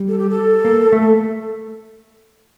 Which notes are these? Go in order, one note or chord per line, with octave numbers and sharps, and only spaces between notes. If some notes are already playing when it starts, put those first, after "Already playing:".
Already playing: G3
A4
G4
A4
A#3
A3